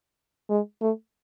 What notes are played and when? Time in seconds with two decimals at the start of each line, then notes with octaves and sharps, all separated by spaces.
0.50 G#3
0.81 A3